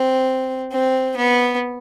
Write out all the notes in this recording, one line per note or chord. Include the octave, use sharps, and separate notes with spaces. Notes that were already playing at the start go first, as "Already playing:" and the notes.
Already playing: C4
C4
B3